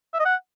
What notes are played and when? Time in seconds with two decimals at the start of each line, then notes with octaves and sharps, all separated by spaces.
0.14 E5
0.20 D#5
0.26 F#5